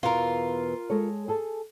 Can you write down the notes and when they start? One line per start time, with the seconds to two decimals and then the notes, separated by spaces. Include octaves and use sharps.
0.03 E2 B2 E3 F4 A#4
0.90 G#3 A4 C#5
1.28 G#4 A4 A5